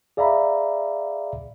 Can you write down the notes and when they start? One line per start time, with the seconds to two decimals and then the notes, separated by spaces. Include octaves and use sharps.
0.17 G#4 D5 E5 F5 A#5 B5